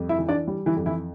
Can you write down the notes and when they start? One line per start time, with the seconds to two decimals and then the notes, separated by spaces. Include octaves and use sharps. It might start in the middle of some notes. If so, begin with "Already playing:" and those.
Already playing: F2 G3
0.09 E4 E5
0.19 E3
0.29 D4 D5
0.48 G3
0.66 E3 E4
0.76 F2
0.86 E3 E4